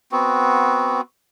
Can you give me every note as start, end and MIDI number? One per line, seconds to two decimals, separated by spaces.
0.12 1.01 59
0.12 1.01 60
0.12 1.01 66